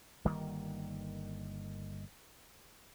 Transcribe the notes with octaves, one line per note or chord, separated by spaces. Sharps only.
G1 D#3 G3 A#3